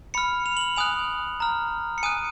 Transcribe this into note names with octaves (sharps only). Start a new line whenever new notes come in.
B5 F6 C#7
F7
F#7
F7
G#5 D#6 F#6 F7
A#5 F6
C#7
G#5 D#6 F#6 D#7